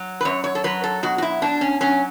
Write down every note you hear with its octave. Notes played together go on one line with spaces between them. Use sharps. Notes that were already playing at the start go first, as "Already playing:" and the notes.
Already playing: F#3
B4
F#2 C#5
C#5
A4
F#3 B4
A4
B2 F#4
F#4
E4
B2 D4
C#4
F#3 C#4